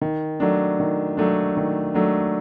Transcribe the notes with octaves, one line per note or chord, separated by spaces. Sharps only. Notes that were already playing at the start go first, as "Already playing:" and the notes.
D#3
F#3 A3 D4
D#3
F#3 A3 D4
D#3
F#3 A3 D4